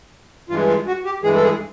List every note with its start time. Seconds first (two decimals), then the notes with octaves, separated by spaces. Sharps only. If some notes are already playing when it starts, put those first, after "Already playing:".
0.49 G2 E3 G#3 F4
0.67 F4
0.87 F#4
1.05 G4
1.23 G2 E3 G#3 G#4
1.35 A4
1.42 G#4